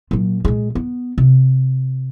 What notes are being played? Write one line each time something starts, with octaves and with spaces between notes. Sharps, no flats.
A#2 F#3
A#2 G#3
B3
C3